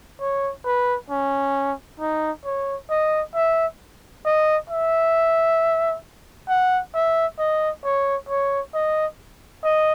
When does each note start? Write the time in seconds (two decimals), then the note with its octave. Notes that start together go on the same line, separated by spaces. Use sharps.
0.21 C#5
0.65 B4
1.10 C#4
2.00 D#4
2.45 C#5
2.90 D#5
3.35 E5
4.25 D#5
4.70 E5
6.49 F#5
6.95 E5
7.39 D#5
7.85 C#5
8.29 C#5
8.74 D#5
9.64 D#5